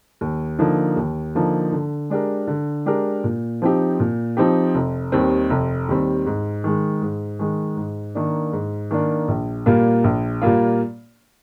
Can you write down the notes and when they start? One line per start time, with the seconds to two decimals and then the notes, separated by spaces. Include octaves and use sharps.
0.21 D#2
0.59 D3 F3 A#3 D#4
0.96 D#2
1.35 D3 F3 A#3 D#4
1.72 D3
2.10 G#3 D4 G4 A#4
2.47 D3
2.86 G#3 D4 G4 A#4
3.24 A#2
3.62 F3 C4 D#4 G4
4.00 A#2
4.37 F3 C4 D#4 G4
4.75 F1
5.12 D#2 D#3 G3 C4
5.50 F1
5.89 D#2 D#3 G3 C4
6.26 G#2
6.64 D#3 G#3
7.02 G#2
7.39 D#3 G#3
7.77 G#2
8.15 D#3 A#3 D4
8.53 G#2
8.91 D#3 A#3 D4
9.28 A#1
9.66 A#2 G3 A#3 F4
10.04 A#1
10.42 A#2 G3 A#3 F4